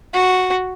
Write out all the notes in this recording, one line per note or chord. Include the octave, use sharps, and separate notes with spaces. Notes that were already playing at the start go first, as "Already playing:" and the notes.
F#4